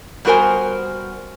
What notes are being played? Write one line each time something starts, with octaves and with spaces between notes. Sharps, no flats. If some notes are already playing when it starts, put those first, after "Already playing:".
G3 B3 F#4 A#4 C5 G#5